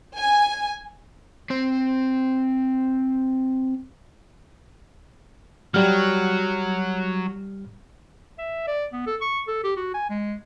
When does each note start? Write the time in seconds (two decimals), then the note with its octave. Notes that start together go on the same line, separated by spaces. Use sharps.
0.16 G#5
1.50 C4 C5
5.74 F#3 G3 F#4 F6
8.39 E5
8.67 D5
8.93 B3
9.07 A4
9.21 C#6
9.48 A4
9.64 G4
9.77 F#4
9.94 G#5
10.10 G#3